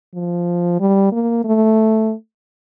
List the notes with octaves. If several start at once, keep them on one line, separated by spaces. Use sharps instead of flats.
F3
G3
A#3
A3